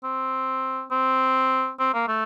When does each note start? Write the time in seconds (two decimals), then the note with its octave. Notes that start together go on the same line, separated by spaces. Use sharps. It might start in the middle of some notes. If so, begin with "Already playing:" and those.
0.04 C4
0.91 C4
1.79 C4
1.94 A#3
2.08 A3